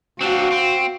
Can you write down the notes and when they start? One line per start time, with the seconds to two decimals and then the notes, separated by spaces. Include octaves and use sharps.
0.21 C4 D4 F#4 F5
0.51 C4